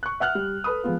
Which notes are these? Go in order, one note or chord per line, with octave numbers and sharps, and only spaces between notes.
C#6 F#6
E5 F#5 F6 F#6
G3
A4 B4 B5 D#6
F3 G#3 B3 F4